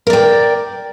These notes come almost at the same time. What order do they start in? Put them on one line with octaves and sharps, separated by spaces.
A#4 D5 G5